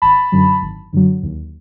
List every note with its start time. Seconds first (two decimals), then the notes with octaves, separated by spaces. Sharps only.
0.02 G#1 A5 B5
0.32 F#2 D3 F#3
0.62 G#1
0.93 F#2 D3 F#3
1.23 D#2